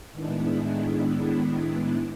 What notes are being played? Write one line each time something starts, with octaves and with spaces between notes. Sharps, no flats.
A2 D#3 G#3 B3 D4 E4